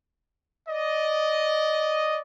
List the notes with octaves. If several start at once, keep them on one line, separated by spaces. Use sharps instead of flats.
D5 D#5